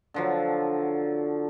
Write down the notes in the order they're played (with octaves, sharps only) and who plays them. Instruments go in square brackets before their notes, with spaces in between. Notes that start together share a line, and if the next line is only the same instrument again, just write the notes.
[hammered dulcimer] D3 F3 F#3